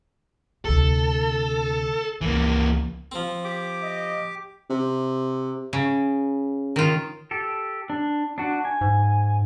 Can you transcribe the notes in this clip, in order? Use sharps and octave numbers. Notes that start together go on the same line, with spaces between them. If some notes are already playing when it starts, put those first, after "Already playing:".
D2 C3 A4
C#2 E3 F3 A#3
F3 C4
G4 D6
D#5
C3
C#3
D#3 F4
G4 A4
D4
D4 F#4
G#5
G#2